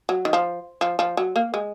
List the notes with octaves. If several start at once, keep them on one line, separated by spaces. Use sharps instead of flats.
F#3
D#3
F3
F3
F3
F#3
A#3
G#3